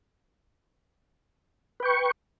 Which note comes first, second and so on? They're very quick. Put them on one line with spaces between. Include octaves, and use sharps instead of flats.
B4 G5 C#6